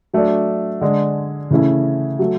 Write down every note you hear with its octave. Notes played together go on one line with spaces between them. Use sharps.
F#3 A3 D4
D3 G#3 D4
C#3 E3 A3 C#4 E4
F#3 A3